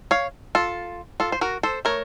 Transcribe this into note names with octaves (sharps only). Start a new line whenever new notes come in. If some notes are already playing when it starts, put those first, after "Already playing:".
C#5 F5
F4 A4
F4 A4
C5
F#4 A#4
A4 C5
A3 A#4 C#5